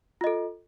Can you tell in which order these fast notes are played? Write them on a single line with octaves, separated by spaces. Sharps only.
F4 D#5 A4